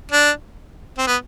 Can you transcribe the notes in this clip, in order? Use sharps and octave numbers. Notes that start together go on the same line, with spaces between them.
D4
C4
B3